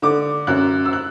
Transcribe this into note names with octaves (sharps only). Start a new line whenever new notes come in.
D3 D6
F#2 F#6
E6
F#6